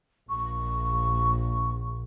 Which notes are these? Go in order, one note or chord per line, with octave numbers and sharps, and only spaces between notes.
A#1 C#6